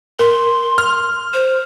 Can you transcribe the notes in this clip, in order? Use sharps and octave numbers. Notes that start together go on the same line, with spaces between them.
A#4 C6
F6
C5